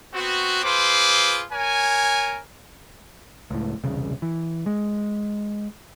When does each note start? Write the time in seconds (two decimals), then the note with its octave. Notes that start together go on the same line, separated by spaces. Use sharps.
0.14 B3 C4 F#4
0.64 F4 G#4 B4 C5 D6
1.52 A#4 C#5 G#5
3.50 C#2 A2
3.84 E1 C2 C#3
4.22 E3
4.66 G#3